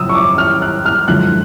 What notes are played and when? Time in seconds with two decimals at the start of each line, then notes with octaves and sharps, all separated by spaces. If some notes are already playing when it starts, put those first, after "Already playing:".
Already playing: F#2 C#3 F3 D#6 E6
0.09 C#6
0.15 D6
0.38 F6
0.62 F#6
0.85 F6
1.08 F#2 D3 F3 G#3 F#6